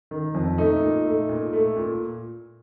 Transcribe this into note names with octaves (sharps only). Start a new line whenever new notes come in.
D#3
F2
A3 D#4
A#2
A3
A#2
A3
A#2